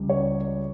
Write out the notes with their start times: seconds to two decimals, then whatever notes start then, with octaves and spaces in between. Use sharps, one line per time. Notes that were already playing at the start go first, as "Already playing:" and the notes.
Already playing: C#2 C#3 G3
0.10 C#5